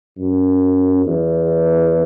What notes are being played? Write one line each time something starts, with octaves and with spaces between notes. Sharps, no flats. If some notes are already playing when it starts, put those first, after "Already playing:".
F#2
E2